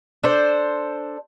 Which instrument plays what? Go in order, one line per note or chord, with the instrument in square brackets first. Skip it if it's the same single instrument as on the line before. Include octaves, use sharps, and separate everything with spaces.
[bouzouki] D4 A4 C5